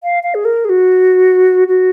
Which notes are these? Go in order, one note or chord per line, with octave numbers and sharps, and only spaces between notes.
F5
F5
G#4
A#4
G#4
F#4
F#4